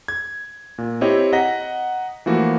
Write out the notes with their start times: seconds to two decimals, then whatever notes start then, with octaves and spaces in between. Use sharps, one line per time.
0.08 G#6
0.78 A#2
1.01 C4 E4 G4 C#5 D#5 G5
1.33 D#5 F#5 A#5 A#6 B6
2.26 E3 F3 A3 A#3 F#4